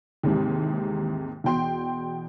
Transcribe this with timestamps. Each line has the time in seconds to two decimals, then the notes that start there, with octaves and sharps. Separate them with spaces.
0.23 D#2 G#2 C3 E3
1.44 E2 B2 G5 C6